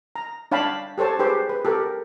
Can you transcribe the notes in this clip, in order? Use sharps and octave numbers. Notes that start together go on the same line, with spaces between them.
A#5
D4 C#5 F5 G5 A5 B5
G4 A4 C5 C#5 A5
G4 G#4 B4 C5
B4
G4 A4 A#4